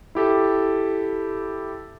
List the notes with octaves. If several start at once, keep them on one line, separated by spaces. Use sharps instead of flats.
E4 G4 A4